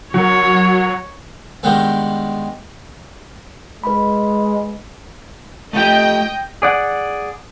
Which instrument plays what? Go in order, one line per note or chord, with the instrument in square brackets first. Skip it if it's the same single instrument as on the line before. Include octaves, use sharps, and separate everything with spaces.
[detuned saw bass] F#3 [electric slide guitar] F#4 A#4 [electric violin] C#5
[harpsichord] G2 D#3 G3 G#3 B3
[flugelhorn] G#3 [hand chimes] B4 B5
[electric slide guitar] A3 F4 G4 [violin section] D#5 G5
[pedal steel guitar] G#4 D5 F#5